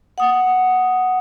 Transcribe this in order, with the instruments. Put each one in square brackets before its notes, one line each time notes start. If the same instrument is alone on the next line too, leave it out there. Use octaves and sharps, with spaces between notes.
[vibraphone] F#5 D#6